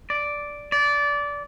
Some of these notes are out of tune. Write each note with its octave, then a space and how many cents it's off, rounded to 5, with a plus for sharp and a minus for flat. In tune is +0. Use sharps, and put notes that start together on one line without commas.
D5 -5
D5 -20